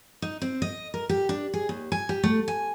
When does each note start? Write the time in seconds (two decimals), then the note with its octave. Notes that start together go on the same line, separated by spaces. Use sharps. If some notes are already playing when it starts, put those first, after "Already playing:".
0.22 D#4
0.42 C4
0.62 D#5
0.94 A#4
1.09 G4
1.29 D4
1.54 G#4
1.69 D#2
1.92 G#5
2.09 G4
2.23 A3
2.48 G#5